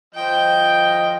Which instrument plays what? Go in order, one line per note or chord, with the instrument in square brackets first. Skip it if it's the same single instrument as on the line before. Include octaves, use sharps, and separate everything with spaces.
[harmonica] F3 D#5 [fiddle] G5